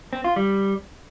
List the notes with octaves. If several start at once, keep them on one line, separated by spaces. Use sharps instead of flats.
C4
F4
G3